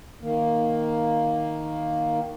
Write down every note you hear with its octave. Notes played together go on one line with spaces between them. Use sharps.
D#3 A#3